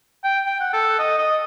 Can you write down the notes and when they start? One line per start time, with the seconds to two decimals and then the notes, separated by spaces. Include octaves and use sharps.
0.24 G5
0.46 G5
0.60 F#5
0.73 A4
0.99 D#5
1.18 D#5